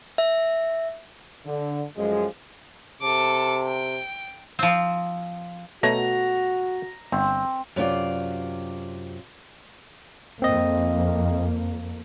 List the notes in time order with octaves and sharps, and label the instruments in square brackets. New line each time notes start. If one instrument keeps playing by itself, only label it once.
[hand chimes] E5
[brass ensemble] D3
F#2 A2 F3 G#3
[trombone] C3 [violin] A4 D6
[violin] G5
[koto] F3 C4
[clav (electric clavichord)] B2 A3 C#5 [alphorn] F#4 [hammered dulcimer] A#5
[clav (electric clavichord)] G1 [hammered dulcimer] C4
[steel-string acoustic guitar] F#2 C3 F4 D5
[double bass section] F2 A#3 [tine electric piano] C4 D#5